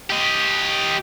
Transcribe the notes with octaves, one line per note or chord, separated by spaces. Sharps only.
G4 D#5